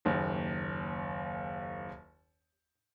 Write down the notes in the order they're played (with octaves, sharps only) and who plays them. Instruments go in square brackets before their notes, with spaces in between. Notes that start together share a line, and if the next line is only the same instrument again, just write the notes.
[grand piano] F#1 D#2